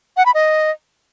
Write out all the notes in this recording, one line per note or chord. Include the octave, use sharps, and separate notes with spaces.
F#5
B5
D#5